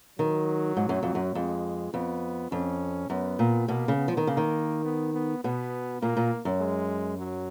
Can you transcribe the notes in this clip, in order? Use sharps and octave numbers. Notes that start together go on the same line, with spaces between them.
D#3 F#3
G#2
F#2
F2
F#2
F2 G#3
F2 B3
F2 C#4
F#2 B3
A#2
B2 A#3
C#3
B3
F3
D#3
C#3 A#3
D#3
B3
B3
B2 B3
A#2 A#3
A#2
F#2
G#3
F#3